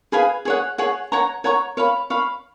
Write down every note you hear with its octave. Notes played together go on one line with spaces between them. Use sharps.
G#4 B4 F5 G#5
G#4 C#5 F#5
G#4 C#5 F#5
C#5 F#5 A#5 C#6
C#5 F#5 A#5 C#6
C#5 F5 B5
C#5 F5 B5